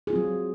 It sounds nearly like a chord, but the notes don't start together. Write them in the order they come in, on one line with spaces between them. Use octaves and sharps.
G#4 F4 C4 F#3